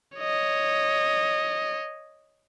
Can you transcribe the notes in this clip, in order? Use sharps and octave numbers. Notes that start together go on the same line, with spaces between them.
C#5 D#5